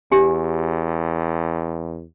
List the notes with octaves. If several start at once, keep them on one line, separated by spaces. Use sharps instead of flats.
E2 G4 G#5